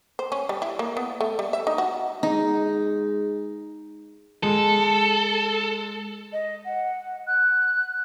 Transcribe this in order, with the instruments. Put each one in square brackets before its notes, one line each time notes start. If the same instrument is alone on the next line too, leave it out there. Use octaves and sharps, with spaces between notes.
[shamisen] C5
C#4
G3
E4
A#3
B3
A3
G3
E5
D#4
F#4
[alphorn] G#3 [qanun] D#4
[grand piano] G#3 [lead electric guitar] A4
[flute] D#5
F#5
F#6